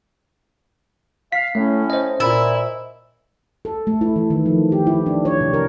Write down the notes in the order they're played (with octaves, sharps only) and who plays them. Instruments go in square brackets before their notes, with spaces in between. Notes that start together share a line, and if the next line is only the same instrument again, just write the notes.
[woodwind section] F5 [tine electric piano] B6
[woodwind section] A2 C#4 [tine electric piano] A3
[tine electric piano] C5 D#5
[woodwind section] A#2 [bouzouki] E4
[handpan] A4
A3
E4
E3
D#3
F3
G4
E4
D4
C#5
C3
A#4